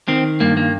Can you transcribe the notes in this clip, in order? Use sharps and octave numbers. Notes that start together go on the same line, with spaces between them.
D#3 C4
G2 A#3
A#3